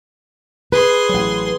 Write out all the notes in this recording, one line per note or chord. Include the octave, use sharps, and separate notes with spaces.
G#4 B4 C6
A1 F#3